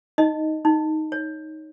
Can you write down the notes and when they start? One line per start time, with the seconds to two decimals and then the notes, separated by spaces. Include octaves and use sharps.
0.18 D#4 D#5
0.65 D#4
1.12 C#5